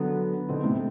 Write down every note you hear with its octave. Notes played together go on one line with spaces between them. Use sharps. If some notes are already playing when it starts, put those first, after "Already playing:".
Already playing: D3 F#3 B3
B2 D3 C4
A2 C3